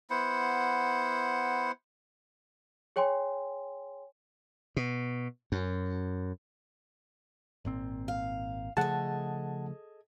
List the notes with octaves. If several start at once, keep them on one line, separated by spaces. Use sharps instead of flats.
B3 E4 C5 F#5
G#4 C#5 G5 G#5 C6
B2
F#2
G#1 A#2 C4
F5
C#3 F3 A3 G#4 A4 D#5 F#5 A5